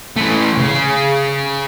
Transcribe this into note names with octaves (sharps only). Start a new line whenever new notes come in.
E3 A3
C#3